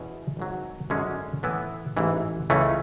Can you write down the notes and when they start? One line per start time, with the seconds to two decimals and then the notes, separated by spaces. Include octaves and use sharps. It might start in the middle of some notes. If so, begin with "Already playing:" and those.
Already playing: E2 B2 G#3 C#4 E4
0.37 G#1 G#2 F#3
0.90 G#1 F#2 D3 G#3 C#4
1.43 A2 E3 B3 E4
1.97 A1 G#2 E3
2.50 C#2 C#3 E3 A3 C#4